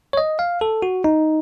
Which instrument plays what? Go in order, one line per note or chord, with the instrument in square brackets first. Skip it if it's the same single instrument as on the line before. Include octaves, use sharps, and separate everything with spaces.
[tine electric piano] C#5
D#5
F5
A4
F#4
D#4